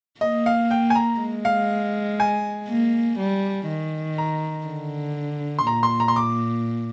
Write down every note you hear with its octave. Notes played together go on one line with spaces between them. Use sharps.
A#3 D#5
F5
G5
G#5
A#5
G#3
F5
G#5
A#3
G3
D#3
A#5
D3
C6
A#2 A#5
C6
A#5
C6
D6